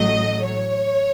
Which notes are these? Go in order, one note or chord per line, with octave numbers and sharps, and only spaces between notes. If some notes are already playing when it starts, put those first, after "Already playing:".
Already playing: A1 A2 F#3 A3 D#5
C#5